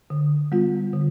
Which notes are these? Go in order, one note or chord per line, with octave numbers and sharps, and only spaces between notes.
D3
G3 B3 F4
D3